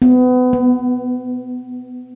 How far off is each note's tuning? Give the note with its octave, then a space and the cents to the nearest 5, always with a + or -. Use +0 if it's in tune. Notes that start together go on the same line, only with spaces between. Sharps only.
B3 +30
B3 -5